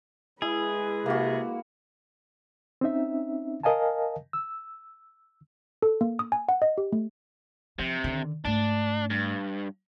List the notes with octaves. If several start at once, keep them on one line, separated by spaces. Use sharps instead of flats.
G#3 E4 G#4 B4
C3 A#3 F#4
C4 C#4 D#4 E5
A#4 D#5 F5 G#5 A5
E6
A4
A#3
D#6
G#5
F#5
D#5
G4
A3
C3 F3
D3 D#3
G#2 A3 D4
G2